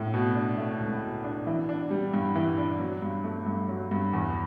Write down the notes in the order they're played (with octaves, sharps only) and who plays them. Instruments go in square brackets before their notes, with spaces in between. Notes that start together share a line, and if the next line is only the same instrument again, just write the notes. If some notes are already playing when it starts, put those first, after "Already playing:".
Already playing: [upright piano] A2
B2
D4
A3
C#2
B2
D4
E3
D4
G3
G2
E3
D4
F#3
G2
A3
G2
F#3
G2
E2